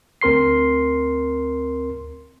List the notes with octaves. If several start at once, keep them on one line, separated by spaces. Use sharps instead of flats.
D2 C4 A#4 C6 C7